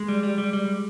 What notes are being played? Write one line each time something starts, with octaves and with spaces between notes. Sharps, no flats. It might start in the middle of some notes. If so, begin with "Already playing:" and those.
Already playing: G#3
G3
G3
G3
G3